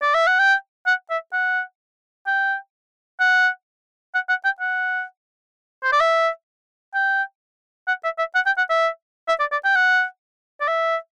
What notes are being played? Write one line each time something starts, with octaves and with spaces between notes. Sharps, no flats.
D5
E5
F#5
G5
F#5
E5
F#5
G5
F#5
F#5
F#5
G5
F#5
C5
D5
E5
G5
F#5
E5
E5
F#5
G5
F#5
E5
E5
D5
D5
G5
F#5
D5
E5